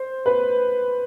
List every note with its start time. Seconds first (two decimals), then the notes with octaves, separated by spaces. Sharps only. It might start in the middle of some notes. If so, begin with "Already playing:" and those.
Already playing: C5
0.26 B4